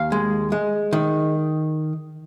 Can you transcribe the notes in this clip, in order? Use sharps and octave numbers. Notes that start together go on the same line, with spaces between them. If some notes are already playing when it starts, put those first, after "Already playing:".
Already playing: D#2 F5
G#3
G#3
D#3